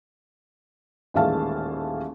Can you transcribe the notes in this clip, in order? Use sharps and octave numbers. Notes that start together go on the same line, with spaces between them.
D#1 A1 G#3 E5 F5 A5